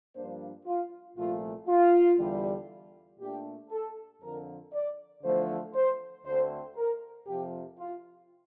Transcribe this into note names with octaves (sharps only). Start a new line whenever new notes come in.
G2 F3 A#3 D4 C5
F4
C2 A#2 F3 A3 F4
F4
E2 D3 G3
A#2 A3 D4 G4
A4
F2 D3 F3 A#4
D5
E2 D3 F3 A3 C5
C5
D2 D3 A3 C4 C5
A#4
F2 C3 F3 G4
F4